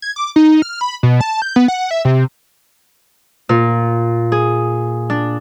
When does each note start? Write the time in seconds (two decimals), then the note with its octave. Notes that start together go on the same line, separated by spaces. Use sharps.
0.02 G#6
0.16 D6
0.36 D#4
0.62 F6
0.81 B5
1.03 B2
1.21 A5
1.42 G6
1.56 B3
1.68 F#5
1.91 E5
2.05 C3
3.49 A#2
4.32 G#4
5.10 D4